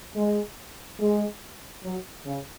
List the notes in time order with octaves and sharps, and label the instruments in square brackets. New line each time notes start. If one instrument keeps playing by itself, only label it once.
[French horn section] G#3
G#3
F#3
C#3